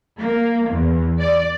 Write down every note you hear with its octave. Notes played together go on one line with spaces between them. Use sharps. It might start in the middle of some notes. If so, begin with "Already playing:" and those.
A#3
E2
D5